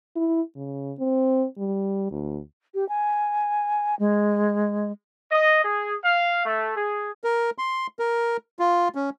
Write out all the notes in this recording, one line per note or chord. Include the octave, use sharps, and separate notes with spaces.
E4
C#3
C4
G3
D2
G4
G#5
G#3
D#5
G#4
F5
A3
G#4
A#4
C6
A#4
F4
C#4